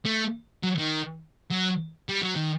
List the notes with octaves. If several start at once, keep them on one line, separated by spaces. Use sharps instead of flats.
A3
F#3
D#3
F#3
G3
F#3
D#3